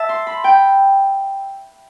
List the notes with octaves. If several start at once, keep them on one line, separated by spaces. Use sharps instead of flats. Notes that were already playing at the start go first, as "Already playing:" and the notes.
Already playing: E5 A5
C6
B5
G5